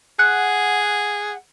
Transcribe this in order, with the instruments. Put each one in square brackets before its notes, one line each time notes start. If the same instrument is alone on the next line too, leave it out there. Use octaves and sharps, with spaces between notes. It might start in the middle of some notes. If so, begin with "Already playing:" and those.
[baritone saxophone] G#4 [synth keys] F#5